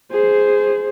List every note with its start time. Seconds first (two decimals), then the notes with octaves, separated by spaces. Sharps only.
0.12 G#4 C5